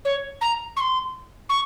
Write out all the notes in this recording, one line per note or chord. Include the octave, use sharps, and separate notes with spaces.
C#5
A#5
C#6
C6
C#6